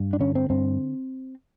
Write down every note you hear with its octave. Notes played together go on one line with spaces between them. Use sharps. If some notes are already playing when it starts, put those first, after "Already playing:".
Already playing: G2
D4
D3 C#4
C4
G2 C4